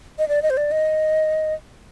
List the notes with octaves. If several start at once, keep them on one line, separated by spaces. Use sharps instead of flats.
D#5
D5
D#5
C5
D5
D#5